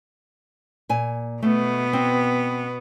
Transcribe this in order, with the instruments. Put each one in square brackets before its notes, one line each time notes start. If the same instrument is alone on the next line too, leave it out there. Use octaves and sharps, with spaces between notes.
[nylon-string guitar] A#2 G#5
[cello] B2 B3 [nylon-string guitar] A3
[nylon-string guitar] C4